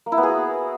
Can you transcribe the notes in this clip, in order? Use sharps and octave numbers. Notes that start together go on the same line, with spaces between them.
A#3
E4
B3
G#4
F#4